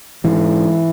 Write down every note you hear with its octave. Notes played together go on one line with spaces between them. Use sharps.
G#2 E3